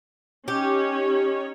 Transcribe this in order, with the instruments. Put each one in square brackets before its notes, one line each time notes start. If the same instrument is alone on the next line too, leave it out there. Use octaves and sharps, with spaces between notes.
[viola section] C#4 D#4 C#5 [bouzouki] G4